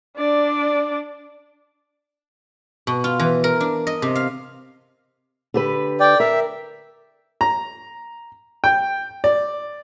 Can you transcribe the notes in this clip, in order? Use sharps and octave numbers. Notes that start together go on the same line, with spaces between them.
D4 D5
B2
F4
E3
A#4
D4
D#5
C3
F5
D3 G4 B4
D5 G5
A#4 E5
A#5
G5
D5